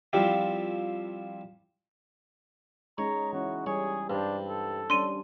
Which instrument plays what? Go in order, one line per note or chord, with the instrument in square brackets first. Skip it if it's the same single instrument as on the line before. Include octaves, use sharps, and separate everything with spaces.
[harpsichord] F3 G3 C4 E4 F4 G4
[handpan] G#3 C#4 D#4 [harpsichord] C#5 [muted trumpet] A#5
[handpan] E3 C#4 E4 [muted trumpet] F#4
[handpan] G3 [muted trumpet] G#4 [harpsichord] C#5
[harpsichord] G2 [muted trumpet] D4 [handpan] C5
[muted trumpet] A4
[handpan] G3 C#4 D4 [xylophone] C6 D#7